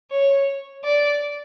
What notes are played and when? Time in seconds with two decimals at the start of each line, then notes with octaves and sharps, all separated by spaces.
0.10 C#5
0.83 D5